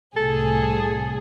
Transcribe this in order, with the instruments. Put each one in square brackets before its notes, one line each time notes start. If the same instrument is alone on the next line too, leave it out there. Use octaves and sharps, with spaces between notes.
[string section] C2 A2 G#4 [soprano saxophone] A4